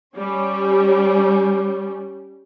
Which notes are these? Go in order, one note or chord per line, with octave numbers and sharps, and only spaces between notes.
G3 C#4